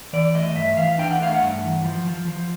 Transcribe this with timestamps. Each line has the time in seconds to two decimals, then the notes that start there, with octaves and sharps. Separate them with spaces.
0.13 E3 D5
0.35 A3 D#5
0.55 G2 E5
0.77 E3 F5
0.98 D4 G5
1.11 F#5
1.20 A3 F5
1.34 F#5
1.42 G2
1.64 E3
1.85 F3
2.07 F3
2.28 F3